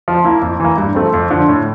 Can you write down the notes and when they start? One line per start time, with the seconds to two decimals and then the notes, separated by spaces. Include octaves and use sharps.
0.08 F3
0.25 A#3 E4
0.42 F2
0.60 E3 A#3
0.78 G2
0.95 F3 A3 C4
1.14 F2
1.30 D3 F3
1.49 A2